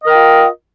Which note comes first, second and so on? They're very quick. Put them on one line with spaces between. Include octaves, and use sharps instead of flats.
D#5 A#4 G5 F4